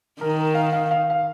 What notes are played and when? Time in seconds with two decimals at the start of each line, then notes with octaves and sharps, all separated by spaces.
0.21 D#3 A#4
0.54 F5
0.73 F5
0.91 F5
1.10 F5